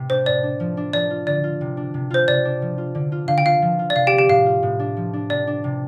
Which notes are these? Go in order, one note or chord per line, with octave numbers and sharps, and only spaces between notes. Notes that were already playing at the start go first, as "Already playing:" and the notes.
Already playing: A2 C3 A3 C4
D4 C5
A2 D5
D4
F3
D4
F3 D5
F4
D3 D5
F4
C3
D4
C3
F4 C5
C3 D5
D4
F3
F4
D3
F4
D3 F5
G5
F4 F5
F3
F4
D5
C3 F5
G4 G5
C4
G4 G5
A2 F5
F4
A2
D4
F3
D4
C3 D5
D4
C3